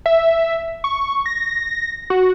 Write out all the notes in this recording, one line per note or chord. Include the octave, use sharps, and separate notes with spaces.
E5
C#6
A#6
F#4